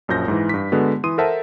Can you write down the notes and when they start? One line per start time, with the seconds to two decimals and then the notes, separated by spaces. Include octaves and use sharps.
0.08 A#1 F#2 F3 G6 A#6
0.28 G#2 E3
0.49 G2 B6
0.72 D3 G#3 B3 F#4
1.04 E3 C6 D#6 D#7
1.18 A4 A#4 C5 E5 F#5 A5